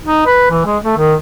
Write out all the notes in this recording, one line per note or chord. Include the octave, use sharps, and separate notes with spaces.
D#4
B4
E3
G#3
A3
D#3